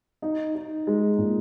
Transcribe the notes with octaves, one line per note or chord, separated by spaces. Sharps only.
D#4
D#4
G#3
A#2